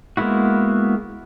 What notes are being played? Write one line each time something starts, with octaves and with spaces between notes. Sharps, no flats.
G#3 A#3 B3 E4 F#4